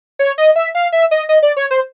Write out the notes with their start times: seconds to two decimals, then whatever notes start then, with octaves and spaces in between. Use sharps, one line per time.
0.19 C#5
0.38 D#5
0.56 E5
0.75 F5
0.92 E5
1.11 D#5
1.29 D#5
1.42 D5
1.57 C#5
1.71 C5